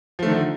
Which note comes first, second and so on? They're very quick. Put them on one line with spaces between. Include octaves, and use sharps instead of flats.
F3 A3 D#3 D3